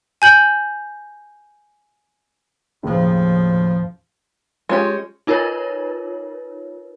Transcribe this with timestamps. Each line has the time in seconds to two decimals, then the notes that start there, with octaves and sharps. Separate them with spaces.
0.22 G#5 G6 F#7
2.83 D#2 A2 C#3 F3
4.69 G#3 C#4 F4 G4
5.27 D#4 F4 A#4 B4 C#5